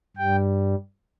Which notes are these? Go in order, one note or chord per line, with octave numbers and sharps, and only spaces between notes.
G2 G3 G5